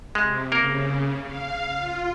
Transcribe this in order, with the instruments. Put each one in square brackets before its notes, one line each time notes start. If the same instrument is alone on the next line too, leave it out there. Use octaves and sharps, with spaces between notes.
[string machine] C3 [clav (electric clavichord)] G#3
[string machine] C#3 [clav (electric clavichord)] A#3 A#4
[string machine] F5
F4